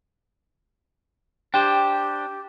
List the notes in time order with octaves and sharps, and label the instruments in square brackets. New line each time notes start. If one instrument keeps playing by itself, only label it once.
[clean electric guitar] D4 C5 [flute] G4 [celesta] G5